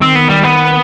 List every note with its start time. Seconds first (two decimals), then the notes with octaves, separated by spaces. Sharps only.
0.01 D#3 C4
0.15 B3
0.29 G3
0.43 B3